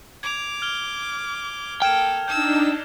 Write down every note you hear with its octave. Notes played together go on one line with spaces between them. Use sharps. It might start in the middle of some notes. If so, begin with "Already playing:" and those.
D6 G#6 F7
F6 G#6 G7
A#3 A4 G5 F6 G#6 E7
D4 D#4 A5 E6 G6